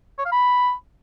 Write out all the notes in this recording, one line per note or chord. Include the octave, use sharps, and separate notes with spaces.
C#5
F5
B5